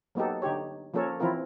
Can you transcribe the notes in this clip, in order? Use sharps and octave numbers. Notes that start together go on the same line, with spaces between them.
F#3 A#3 B3 D#4 G4 A4
D3 D#4 G4 C#5
F3 A#3 C#4 A4 A#4 C#5
E3 F3 C4 E4 F4 A#4